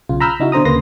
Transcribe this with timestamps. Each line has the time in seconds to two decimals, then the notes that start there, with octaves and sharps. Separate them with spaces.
0.09 B1 C#3 F4
0.20 A#5 B5 E6 F6 G6
0.39 C#3 D#4 E4 F#4
0.52 B2 D3 C5 A#5 D#6
0.65 D2 C#3 A#3 B4 C6 A#6